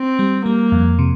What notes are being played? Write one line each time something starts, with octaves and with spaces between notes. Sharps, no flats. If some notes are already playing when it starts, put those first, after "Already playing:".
Already playing: C4
G3
G3 A#3
F2
C3